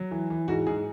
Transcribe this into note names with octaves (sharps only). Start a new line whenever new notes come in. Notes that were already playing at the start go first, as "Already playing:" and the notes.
Already playing: F#3
E3
E3
G#2 F#4
G#2 G#4